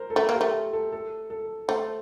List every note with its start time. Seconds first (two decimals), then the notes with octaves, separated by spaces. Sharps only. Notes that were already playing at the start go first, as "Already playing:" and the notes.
Already playing: A#4 C5
0.10 A4
0.16 A3 A#4
0.29 A#3
0.35 G4
0.41 A3
0.73 A4
0.92 A4
1.30 A4
1.68 A3 C5